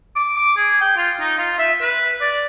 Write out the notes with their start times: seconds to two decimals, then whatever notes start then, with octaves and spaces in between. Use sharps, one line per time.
0.16 D6
0.36 D6
0.57 G#4
0.81 G5
0.97 F4
1.20 D#4
1.38 F4
1.59 E5
1.81 B4
2.21 D5